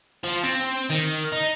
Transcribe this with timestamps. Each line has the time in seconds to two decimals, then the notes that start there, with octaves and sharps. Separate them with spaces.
0.24 F3
0.44 C4
0.90 D#3
1.32 D#4